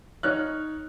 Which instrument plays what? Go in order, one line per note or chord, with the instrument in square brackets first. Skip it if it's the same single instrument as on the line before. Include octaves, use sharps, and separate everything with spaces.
[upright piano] D#4 C#5 F6 F#6